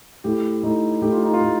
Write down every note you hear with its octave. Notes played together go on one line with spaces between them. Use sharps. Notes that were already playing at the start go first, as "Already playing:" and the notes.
A2 G4
A2 D#4
A2 G4
F4
D#4
F4
A2